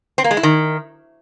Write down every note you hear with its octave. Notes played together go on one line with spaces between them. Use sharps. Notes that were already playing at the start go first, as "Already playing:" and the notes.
C4
A#3
G#3
E4
D#3